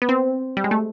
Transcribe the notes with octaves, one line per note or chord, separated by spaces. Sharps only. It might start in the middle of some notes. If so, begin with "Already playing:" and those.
B3
C4
G3
G#3
A3